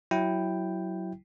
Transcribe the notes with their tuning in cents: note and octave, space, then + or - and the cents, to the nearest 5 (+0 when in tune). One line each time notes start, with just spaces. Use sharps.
F#3 +15 E4 +0 G5 +0